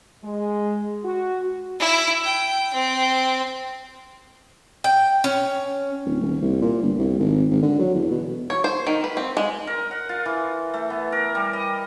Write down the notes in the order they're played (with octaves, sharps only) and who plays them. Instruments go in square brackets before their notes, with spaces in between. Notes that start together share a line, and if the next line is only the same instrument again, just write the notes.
[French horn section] G#3
F#4
[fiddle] E4
G5
C4
[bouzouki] G5
C#4
[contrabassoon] D1
D#1
C2
A#2
G1
C2
G#1
G#1
D3
F#3
E2
B2
[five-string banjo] C#5
C5
D#3
B4
C4
G#3
[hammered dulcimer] A#4
F#5
F4
E3
A3
B3
A#4
G3
D#5